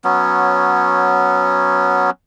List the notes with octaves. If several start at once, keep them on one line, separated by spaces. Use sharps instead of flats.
F#3 B3 C#4